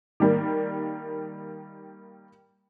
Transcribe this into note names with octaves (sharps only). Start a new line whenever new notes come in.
D#3 G3 A#3